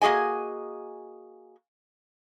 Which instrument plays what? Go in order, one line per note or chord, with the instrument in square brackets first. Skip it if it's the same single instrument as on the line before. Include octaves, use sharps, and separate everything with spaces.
[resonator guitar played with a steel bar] A#3 F#4 G#4 D#5 G#5